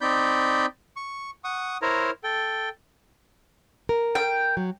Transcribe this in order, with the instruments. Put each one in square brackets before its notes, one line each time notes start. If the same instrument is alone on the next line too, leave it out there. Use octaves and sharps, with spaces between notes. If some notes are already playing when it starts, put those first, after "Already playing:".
[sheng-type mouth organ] C4 D#4 D5 B5 G6
C#6
F#5 C#6 D#6
E4 A#4 C5 C#5 A#5
A4 G5
[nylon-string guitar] A#4
[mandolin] G5
[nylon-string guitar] F#3